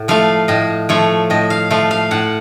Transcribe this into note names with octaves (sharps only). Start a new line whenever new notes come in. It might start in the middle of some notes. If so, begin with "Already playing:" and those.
Already playing: A2
F3 A3 F5
A2 D#5
F3 A3 C#5
A2 D#5
F5
F3 A3 F5
F5
A2 F#5